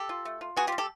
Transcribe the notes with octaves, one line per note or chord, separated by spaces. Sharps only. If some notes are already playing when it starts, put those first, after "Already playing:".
Already playing: G4 A4
F4
A3
F4
B3 F#4 G#4
F4 G4
G3
G4 A4